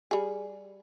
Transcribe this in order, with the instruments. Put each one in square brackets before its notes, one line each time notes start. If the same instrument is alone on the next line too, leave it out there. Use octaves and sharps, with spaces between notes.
[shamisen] G3 G#4